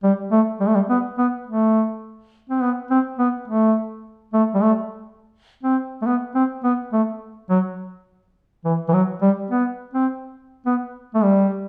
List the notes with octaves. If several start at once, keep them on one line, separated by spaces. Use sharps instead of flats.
G3
A3
G3
A3
G3
B3
B3
A3
C4
B3
C4
B3
A3
A3
G3
A3
C4
A3
B3
C4
B3
A3
F#3
E3
E3
F#3
G3
B3
C4
B3
A3
G3